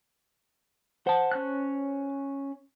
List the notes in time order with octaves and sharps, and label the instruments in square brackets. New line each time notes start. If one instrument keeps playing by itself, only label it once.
[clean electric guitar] C5 A5 [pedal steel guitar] F#5
[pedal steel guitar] C#4 C#5 F#6